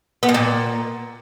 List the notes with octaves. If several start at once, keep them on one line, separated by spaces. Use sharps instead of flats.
B3
B2
A#2